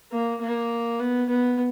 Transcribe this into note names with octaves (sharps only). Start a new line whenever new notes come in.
A#3
A#3
B3
B3